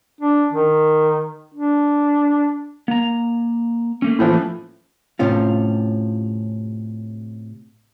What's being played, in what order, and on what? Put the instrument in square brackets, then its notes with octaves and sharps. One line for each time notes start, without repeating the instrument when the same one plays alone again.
[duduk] D4
D#3
D4
[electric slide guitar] A#3 A#5
A3 A#3 C#4
[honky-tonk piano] A2 E3 F3
[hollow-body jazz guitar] A2 C3 C#4 F4